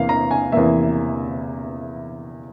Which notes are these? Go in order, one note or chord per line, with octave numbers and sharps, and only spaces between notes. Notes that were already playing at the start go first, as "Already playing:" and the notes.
Already playing: E2 C3 E3 A#3 F5
A#5
G#5
E2 C3 E3 A#3 E5